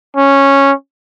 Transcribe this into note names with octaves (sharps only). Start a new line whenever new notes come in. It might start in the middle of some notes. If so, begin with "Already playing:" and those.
C#4